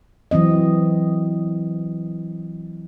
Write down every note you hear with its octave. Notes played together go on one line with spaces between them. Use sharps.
E3 F#3 C4 D#5